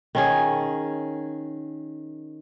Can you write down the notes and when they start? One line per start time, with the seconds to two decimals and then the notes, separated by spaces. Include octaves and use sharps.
0.15 D#3 C#4 G#4